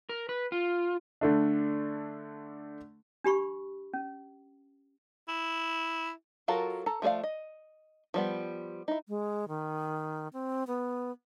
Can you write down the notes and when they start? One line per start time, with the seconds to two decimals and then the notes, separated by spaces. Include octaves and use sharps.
0.09 A#4
0.29 B4
0.52 F4
1.21 D3 A3 D4
3.24 D4 G4 B5 C#6
3.94 C#4
5.28 E4
6.48 F#3 F4 F#4 A4 A#4
6.86 A4 A5 A#5
7.02 F3 A3 G#4 D5 F5
7.24 D#5
8.14 F3 G3 B3
8.88 D#4 E4
9.07 G#3
9.48 D#3
10.33 C4
10.67 B3